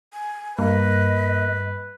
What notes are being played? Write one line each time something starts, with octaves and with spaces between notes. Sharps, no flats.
G#5
G2 A#3 B4 D#5